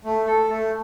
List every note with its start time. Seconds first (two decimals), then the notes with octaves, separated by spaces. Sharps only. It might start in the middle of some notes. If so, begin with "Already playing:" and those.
0.05 A3
0.27 A4
0.49 A3